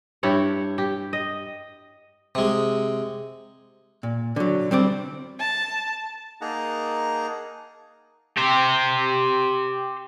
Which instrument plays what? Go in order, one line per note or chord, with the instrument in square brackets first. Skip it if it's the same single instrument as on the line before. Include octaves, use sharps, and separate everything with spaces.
[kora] G2 E4 G4 C#5
G4
D#5
[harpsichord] C3 G#3
[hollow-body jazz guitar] A#2
D3 F#3
G3 C4 C5 D5
[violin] A5
[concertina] A#3 D#4 G#4 F#5 A5 A#5
[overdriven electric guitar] G4 C5